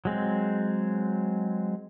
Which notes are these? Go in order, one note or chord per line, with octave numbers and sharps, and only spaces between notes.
F#3 G#3 C4